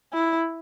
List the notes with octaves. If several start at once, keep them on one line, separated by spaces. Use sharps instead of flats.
E4